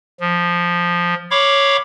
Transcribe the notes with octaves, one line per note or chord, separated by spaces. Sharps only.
F3
C#5 F5 B5 C#6 D6